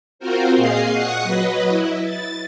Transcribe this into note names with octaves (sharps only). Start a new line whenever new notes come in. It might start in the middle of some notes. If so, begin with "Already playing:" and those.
C4 F4 F#4 A#4 C5
A#2 G#4 D#5 F5 C7
F#5 C#6 D#6 F#6
F#3 B4 D#5
E4
A6